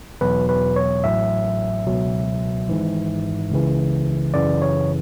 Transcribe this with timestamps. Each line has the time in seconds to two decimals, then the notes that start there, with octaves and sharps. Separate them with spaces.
0.21 E2 B2 F#3 B4
0.49 B4
0.76 C#5
1.04 A1 A2 F#3 E5
1.87 C#2 B2 F#3
2.69 G#1 G#2 E3
3.51 C#2 C#3 E3
4.34 F#2 C#3 E3 D5
4.62 C#5